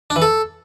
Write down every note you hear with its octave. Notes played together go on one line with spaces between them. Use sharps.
D4
E3
A4